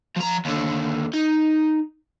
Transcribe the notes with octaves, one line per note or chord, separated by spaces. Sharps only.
F3 A#5
D#2 D3
D#4